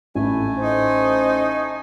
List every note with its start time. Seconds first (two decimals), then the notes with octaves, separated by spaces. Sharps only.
0.15 A1 A3 E4 G#5
0.57 D#4 C5